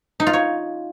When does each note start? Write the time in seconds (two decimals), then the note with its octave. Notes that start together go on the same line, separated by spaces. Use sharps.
0.20 D#4
0.27 F4
0.33 C#5